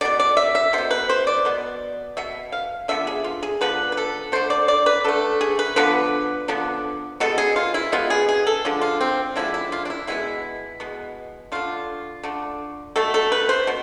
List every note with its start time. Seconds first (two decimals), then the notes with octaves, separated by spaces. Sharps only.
0.01 B2 B3 D5
0.19 D5
0.37 E5
0.55 E5
0.73 B2 B3 C5
0.91 B4
1.09 C5
1.27 D5
1.45 B2 B3
2.17 B2 B3 E5
2.52 F5
2.88 D3 F3 B3 E5
3.07 G#4
3.24 F4
3.43 G#4
3.61 D3 F3 B3 B4
3.92 B4
3.97 A4
4.32 D3 A3 C5
4.50 D5
4.68 D5
4.86 B4
5.04 D3 A3 A4
5.41 G#4
5.59 B4
5.76 D3 F3 B3 B4
6.48 D3 F3 B3
7.20 B2 G#3 B3 A4
7.38 G#4
7.56 F4
7.74 E4
7.92 B2 G#3 B3 F4
8.10 G#4
8.29 G#4
8.47 A4
8.65 D3 F3 G#3
8.81 F4
9.01 C4
9.36 D3 F3 G#3 E4
9.54 E4
9.72 F4
9.85 D4
9.90 E4
10.07 B2 G#3 B3 E4
10.80 B2 G#3 B3
11.52 D3 A3 F4
12.23 D3 A3
12.96 B2 A3 A4
13.14 A4
13.32 B4
13.49 C5
13.67 B2